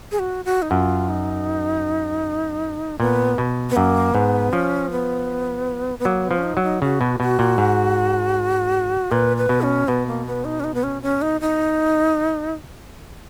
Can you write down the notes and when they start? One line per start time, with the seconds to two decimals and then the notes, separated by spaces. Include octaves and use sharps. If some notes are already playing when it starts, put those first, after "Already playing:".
0.12 G#4
0.19 F#4
0.45 F#4
0.62 D#4
0.70 F#2 F4
1.08 D#4
3.00 A#2 B3
3.38 B2
3.70 B3
3.76 F#2 A#3
4.14 G#2 B3
4.53 F3 C#4
4.91 B3
5.99 B3
6.05 F#3 A#3
6.25 B3
6.31 F3
6.37 C#4
6.44 D#4
6.57 F#3
6.63 D#4
6.82 C#3 F#4
7.01 B2
7.20 B2 F#4
7.39 A#2
7.58 G#2
9.11 A#2 B4
9.37 B4
9.49 B2
9.62 C#4
9.88 B2 B3
10.07 A#3
10.26 B3
10.45 D#4
10.60 C#4
10.64 D#4
10.74 B3
10.83 C#4
11.02 C#4
11.22 D#4
11.41 D#4